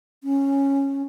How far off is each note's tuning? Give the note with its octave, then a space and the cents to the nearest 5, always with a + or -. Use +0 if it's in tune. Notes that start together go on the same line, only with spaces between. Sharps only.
C#4 -10